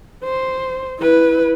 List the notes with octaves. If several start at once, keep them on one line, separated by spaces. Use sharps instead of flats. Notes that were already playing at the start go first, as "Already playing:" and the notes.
C5
E4 B4